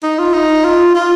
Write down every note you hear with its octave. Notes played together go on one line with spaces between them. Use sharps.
D#4
F4
D#4
F4
F4